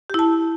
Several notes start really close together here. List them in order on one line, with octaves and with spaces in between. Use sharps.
G4 E4 A5